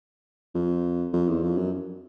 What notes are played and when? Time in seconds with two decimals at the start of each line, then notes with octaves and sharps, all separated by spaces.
0.55 F2
1.13 F2
1.28 E2
1.43 F2
1.57 F#2